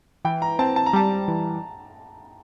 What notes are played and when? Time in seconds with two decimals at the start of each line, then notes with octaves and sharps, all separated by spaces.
0.25 E3 G5
0.42 A#5
0.59 C4 A5
0.76 A5
0.86 A#5
0.93 G3 A5
1.28 E3